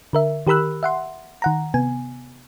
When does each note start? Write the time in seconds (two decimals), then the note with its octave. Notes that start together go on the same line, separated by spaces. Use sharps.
0.13 D3 A#4 E5
0.47 D#3 G4 A#4 B5 E6 F#6
0.83 E5 F#5 C6
1.42 D#3 F#5 A#5
1.74 C3 B3 G#5